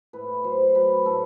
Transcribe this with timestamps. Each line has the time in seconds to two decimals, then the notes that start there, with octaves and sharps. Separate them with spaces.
0.13 A2 B4
0.44 F#3 C5
0.75 F#3 B4
1.06 A2 A4